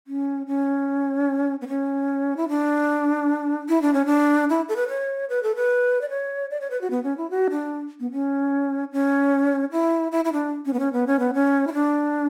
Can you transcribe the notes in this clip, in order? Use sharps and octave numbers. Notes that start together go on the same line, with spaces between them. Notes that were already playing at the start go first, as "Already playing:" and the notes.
C#4
C#4
B3
C#4
E4
D4
E4
D4
C#4
D4
E4
A4
B4
C#5
B4
A4
B4
D5
C#5
D5
C#5
B4
F#4
B3
C#4
E4
F#4
D4
B3
C#4
C#4
E4
E4
E4
D4
C#4
B3
C#4
B3
C#4
B3
C#4
E4
D4